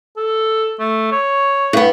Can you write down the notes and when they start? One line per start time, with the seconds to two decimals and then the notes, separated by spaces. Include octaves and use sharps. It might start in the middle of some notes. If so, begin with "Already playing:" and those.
0.17 A4
0.80 A3
1.12 C#5
1.73 G2 B3